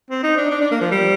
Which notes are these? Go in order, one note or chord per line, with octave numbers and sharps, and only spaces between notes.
C4
D#4
D4
D4
D4
A#3
F3
G3